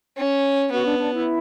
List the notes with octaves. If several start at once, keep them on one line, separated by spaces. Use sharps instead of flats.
C#4
B3 F#4
D4
D4
E4